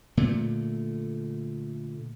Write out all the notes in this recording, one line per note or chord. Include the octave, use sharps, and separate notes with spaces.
A#2 D3 A3